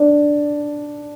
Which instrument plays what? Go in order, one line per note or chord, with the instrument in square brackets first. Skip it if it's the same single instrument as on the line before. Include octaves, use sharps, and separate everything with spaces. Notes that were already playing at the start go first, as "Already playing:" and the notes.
Already playing: [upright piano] D4